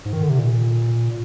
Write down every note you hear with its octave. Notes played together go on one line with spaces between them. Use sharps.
G#2
D#3
D3
C3
A#2